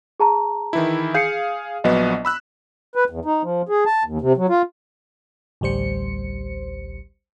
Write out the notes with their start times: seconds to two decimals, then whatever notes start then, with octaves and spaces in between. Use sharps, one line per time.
0.20 G#4 A5 A#5
0.73 D#3 E3 E4
1.15 G#4 F5 G6 C7 C#7
1.84 A#1 F#3 B3 D#5
2.25 B5 E6 F#6
2.95 B4
3.10 E2
3.25 D#4
3.43 F3
3.69 G#4
3.86 A5
4.04 D#2
4.21 C3
4.37 F#3
4.49 F4
5.61 A1 D2 G3 C5 C#7